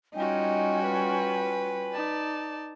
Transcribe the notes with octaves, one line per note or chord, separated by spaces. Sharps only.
G3 C#4 D#4 F4 F#4 G5 G#5
B4
D#4 D5 A5